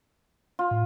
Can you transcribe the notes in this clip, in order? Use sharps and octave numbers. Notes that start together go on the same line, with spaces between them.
F4
A2